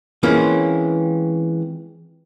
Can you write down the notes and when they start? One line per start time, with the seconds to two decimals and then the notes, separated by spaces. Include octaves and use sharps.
0.23 E3 G#3 A#3 C4 C#4 F4